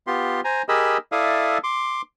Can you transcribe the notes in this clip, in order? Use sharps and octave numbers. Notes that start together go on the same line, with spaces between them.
B3 F4 G4 C6
C5 G#5 A#5
G4 G#4 A#4 D#5 B5 E6
E4 A4 D5 E5 F5 D#6
C6 D6